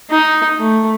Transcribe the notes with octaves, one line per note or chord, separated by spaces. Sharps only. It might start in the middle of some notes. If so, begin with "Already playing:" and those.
D#4
A3